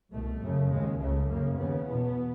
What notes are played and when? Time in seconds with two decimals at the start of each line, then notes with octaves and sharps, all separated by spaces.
0.13 C2 B2 A3
0.42 F#2 C#3
0.71 D#2 C#3 G#3
0.99 C#2 C#3 A3
1.28 F#2 C#3 A#3
1.57 D#2 C#3 B3
1.86 E2 B2